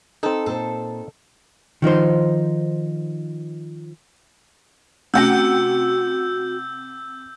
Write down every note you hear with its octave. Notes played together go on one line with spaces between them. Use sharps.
C4 D#4 A4
A#2 A4 C5
D#3 F3 D#4 C5
C3 A3 C#4 F#4 F#5 G5 E6 G6